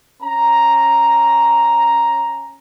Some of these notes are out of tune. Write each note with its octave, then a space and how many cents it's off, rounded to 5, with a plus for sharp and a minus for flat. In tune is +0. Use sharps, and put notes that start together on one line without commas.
C#4 -10 A#5 +5